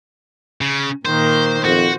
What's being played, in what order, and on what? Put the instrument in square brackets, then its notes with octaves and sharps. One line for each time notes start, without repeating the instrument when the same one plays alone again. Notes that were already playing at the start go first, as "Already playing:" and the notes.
[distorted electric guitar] C#3
[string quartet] A#2 D#3 A#3 [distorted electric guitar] C5
[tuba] F2 [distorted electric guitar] F#4 [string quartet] C5